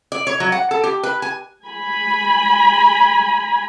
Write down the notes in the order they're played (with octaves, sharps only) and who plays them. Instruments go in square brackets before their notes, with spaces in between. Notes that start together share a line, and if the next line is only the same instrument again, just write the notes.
[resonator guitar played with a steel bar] D5
C#5
F#3
F#5
A4
G4
B4
G#5
[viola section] G#5 B5